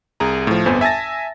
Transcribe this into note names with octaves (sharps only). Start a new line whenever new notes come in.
C2 G#4 A#5
A2 F3
G1 F2 B3 C5 G#5
E5 G#5 A5 A6 A#6